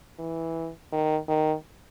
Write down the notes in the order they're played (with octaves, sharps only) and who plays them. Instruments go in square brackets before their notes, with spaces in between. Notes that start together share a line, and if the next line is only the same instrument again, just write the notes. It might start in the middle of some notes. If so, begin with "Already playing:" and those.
[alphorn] E3
D#3
D#3